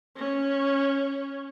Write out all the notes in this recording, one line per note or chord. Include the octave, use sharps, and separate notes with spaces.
C#4